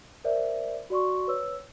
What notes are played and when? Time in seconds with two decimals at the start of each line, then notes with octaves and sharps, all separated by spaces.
0.24 A#4 C5 D5 E5
0.90 F#4 D5 C6 C#6
1.27 B4 C#5 E6